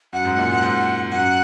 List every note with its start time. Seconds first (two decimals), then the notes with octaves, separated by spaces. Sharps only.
0.13 F#2 F#5
0.25 G#2
0.38 A#2
0.50 G#2
0.62 G#2
1.11 F#2 F#5